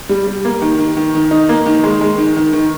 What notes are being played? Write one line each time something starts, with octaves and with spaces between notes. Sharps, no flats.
G3
G3
A#3
D#3
D#3
D#3
D#3
D#4
A#3
D#3
G#3
G#3
D#3
D#3
D#3